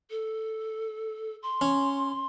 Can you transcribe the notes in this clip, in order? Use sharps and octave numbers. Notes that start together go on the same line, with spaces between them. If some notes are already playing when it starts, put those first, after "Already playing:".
A4
C6
C#4